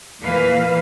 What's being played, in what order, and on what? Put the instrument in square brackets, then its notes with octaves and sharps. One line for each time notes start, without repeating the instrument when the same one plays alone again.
[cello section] E2 A#2 E3 A#3 B4 F5